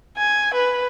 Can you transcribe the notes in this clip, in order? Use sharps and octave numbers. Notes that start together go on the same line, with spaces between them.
G#5
B4